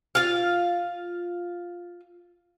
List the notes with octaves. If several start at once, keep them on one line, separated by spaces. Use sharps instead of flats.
F4 F5